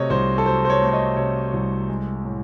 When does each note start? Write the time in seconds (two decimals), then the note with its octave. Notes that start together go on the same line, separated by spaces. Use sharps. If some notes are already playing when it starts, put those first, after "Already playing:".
Already playing: C3 F#3 A3 C#5 D#5
0.10 C2 C5
0.38 A4
0.46 F#3 C5
0.65 C5
0.70 C#5
0.82 A3
0.89 C#5
0.93 D#5
1.17 C3 C#5
1.53 C2
1.89 G#3
2.25 A2